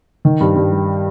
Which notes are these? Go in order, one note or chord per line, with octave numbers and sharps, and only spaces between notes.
D#3
G2
G2
G3